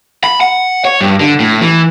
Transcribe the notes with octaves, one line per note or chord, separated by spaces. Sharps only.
B5
F#5
C#5
G2
D3
A2
E3